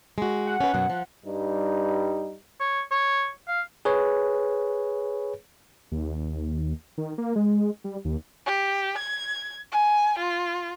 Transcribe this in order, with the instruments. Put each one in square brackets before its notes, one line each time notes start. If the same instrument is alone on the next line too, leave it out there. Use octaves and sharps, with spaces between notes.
[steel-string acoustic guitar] G#3 F#4
[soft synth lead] F#5
[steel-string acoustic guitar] C#4 B4
F#2 B2 F#3
F3
[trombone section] G2 G3 D#4
[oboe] C#5
C#5
F5
[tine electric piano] G#4 B4 C#5
[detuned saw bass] D#2
D#3
A#3
G#3
G3
D#2
[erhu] G4
G#6
G#5
F4